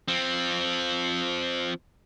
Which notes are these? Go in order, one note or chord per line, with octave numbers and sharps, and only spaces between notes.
F3 C4